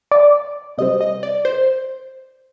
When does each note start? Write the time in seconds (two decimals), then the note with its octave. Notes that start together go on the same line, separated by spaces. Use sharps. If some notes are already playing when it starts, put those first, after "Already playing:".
0.11 D5
0.78 C3 G3 C4 D#5
1.01 D#5
1.23 D5
1.45 C5